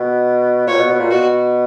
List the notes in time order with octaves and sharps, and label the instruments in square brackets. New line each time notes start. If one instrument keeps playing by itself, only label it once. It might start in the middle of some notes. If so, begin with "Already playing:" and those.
Already playing: [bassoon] B2
[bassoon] A#2 [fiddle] C#5
[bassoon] B2
B2
A#2
[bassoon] B2 [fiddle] F#4